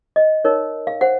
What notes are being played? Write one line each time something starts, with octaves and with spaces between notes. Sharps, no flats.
D#5
D#4 A#4 C#5
F5
C5 F#5